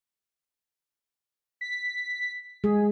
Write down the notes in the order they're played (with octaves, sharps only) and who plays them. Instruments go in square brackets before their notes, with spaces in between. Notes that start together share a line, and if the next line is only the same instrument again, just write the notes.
[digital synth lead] B6
[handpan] G#3 [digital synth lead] G#4